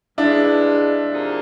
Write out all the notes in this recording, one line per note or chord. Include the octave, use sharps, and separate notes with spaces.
G2 E3 G#3 D4 E4
C3 F3 A#3 D#4 G#4